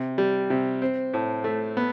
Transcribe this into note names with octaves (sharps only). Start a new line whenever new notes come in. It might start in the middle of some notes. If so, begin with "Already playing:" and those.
Already playing: C3
G3
C3
C4
A2
A3
B3